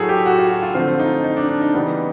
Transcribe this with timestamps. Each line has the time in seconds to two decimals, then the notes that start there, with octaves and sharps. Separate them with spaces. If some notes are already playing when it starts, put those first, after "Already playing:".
Already playing: A2 F#3 A3 G#4 A4
0.09 G4
0.26 F#4
0.38 F4
0.50 F#4
0.62 F4
0.74 D3 F3 A3 C4 F4
0.99 D#4
1.24 D#4
1.36 D4
1.48 D4
1.62 D#4
1.74 C#3 E3 G3 B3